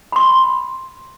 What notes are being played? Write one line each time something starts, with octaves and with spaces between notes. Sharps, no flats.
B5 C6